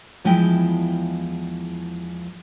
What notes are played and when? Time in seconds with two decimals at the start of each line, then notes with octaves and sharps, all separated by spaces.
0.25 E2 F3 G#3 E4 G5 A5